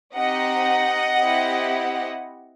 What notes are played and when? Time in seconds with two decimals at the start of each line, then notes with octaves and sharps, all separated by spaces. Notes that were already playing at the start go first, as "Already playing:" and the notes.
0.15 C4 D#4 G4 D#5 F#5
1.21 C4 E4 G4